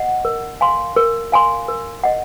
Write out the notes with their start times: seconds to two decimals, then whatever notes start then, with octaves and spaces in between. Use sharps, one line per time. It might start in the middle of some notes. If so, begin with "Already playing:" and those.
Already playing: D#5 F#5
0.25 A#4
0.61 F5 G#5 C6
0.96 A#4
1.32 F5 G#5 C6
1.68 A#4
2.04 D#5 F#5